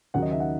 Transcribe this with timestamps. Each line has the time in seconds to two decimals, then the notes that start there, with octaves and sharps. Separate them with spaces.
0.14 D#2 C#3 F#3 F#5
0.22 D#5
0.31 E5
0.40 F#5